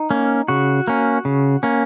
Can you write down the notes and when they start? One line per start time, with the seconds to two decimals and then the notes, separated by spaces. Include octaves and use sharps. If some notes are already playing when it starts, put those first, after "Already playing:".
Already playing: D#4
0.11 A#3 C#4
0.48 C#3 F#4
0.88 A#3 C#4
1.25 C#3
1.63 A#3 C#4